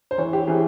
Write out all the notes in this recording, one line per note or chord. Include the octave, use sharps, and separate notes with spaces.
C5
E3 C#5
G4
E3 G#4